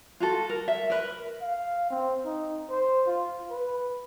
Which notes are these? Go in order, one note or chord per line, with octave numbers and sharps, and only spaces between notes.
F4 F#4 A4
A#4
E5
A#4 B4
F5
C4
D#4
C5
F4
B4